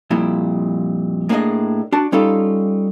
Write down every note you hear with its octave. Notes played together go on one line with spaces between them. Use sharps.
F2 A#2 G3 E4
A2 A#3 D4 F4 G#4 D#5
D4 F#4 A5
G3 C#4 D#4 F4 A4 F5